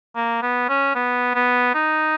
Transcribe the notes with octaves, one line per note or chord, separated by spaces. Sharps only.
A#3
B3
C#4
B3
B3
D#4